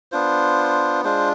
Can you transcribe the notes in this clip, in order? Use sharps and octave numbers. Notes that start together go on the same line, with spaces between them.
B3 D4 F4 C5
G#3 D4 F4 C5